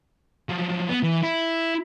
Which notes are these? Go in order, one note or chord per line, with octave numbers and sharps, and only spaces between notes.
F3 F#3
B3
E3
E4